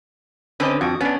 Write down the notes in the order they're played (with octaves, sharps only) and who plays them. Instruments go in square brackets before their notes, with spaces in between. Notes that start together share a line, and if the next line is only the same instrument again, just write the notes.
[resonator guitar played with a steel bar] D3 C4 C#4 [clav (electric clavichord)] B4 D#5
[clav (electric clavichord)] F2 [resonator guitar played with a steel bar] F#4
[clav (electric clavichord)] B3 D4 [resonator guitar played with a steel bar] C#4